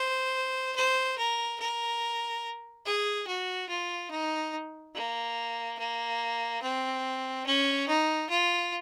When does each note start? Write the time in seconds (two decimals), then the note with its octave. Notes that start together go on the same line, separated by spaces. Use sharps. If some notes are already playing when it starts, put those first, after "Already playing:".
Already playing: C5
0.76 C5
1.18 A#4
1.60 A#4
2.86 G#4
3.27 F#4
3.69 F4
4.11 D#4
4.95 A#3
5.79 A#3
6.62 C4
7.46 C#4
7.88 D#4
8.30 F4